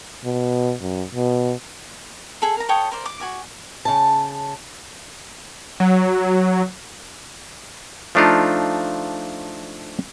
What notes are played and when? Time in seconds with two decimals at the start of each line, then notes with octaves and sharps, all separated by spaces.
0.24 B2
0.81 F#2
1.15 B2
2.42 G#4 A4
2.57 A#4 A#5
2.69 A4 C#5 G5 D#6
2.92 A#4 C5 D5
3.06 D6
3.20 F#4 G#5 D6
3.85 C#3 A5
5.80 F#3
8.15 F3 A3 D4 D#4 F4